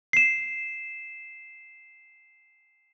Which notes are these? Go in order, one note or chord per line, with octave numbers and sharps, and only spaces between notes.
C7 E7